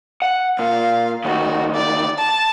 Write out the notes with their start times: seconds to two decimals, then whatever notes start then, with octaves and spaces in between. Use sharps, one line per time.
0.22 F#5
0.59 A#2 F5
1.25 D2 D#3 F#4
1.74 D5
2.18 A5